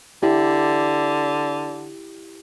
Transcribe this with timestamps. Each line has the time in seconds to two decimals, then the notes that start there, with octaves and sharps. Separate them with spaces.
0.23 D3 E4 G4